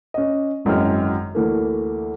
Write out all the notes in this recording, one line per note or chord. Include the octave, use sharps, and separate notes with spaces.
C#4 D#5
G#1 F#2 E3 G#3 G5 F6
D2 E3 A3 A#3